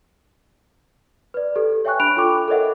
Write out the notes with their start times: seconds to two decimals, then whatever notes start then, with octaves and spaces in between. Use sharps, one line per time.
1.34 B4 D5
1.56 G4 A4
1.85 C#5 E5 G5 G#5 C#6 F#6
2.00 D4 B5 F#6 D7 F7
2.17 F4 A4 G5 C#6 D6
2.48 A4 A#4 C#5 D#5 E5 F#5